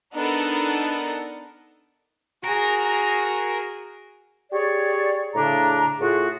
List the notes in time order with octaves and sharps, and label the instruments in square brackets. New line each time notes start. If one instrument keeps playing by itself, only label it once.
[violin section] B3 D4 D#4 A4 A#4 F#5
[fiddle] F#4 G#4 [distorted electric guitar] A#4
[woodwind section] G4 G#4 C#5 D5
A2 C#3 D4 A#5
A2 F4 F#4 G#4